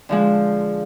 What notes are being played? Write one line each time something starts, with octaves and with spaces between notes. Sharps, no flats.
D3 F3 G#3